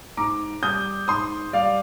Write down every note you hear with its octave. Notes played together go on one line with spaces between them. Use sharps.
G#2 A#5 D6
G3 D#6 G6
G#2 C6 D#6
G3 D5 F5